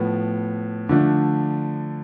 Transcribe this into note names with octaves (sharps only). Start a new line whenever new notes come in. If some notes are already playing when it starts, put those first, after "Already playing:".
Already playing: A2 F3 B3
D3 F3 A3 D4